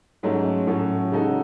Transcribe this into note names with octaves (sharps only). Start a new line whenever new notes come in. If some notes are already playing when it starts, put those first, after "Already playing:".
G#2 F#3 A3 C#4
A2 F#3 C#4 F#4 A4
C#3 G#3 D#4 F#4 A4